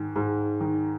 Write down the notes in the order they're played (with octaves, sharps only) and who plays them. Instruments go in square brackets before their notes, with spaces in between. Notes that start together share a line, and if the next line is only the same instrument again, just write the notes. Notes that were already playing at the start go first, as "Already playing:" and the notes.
Already playing: [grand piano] G#2 D#3
G#2
D#3